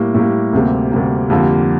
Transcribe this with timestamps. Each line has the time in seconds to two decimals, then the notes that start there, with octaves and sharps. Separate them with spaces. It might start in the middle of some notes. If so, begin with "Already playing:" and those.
Already playing: A2 G3 A#3
0.14 A2 G3 A#3
0.53 D2 C3 G3 A#3
0.91 D2 C3 G3 A#3
1.30 F2 D3 G3 A#3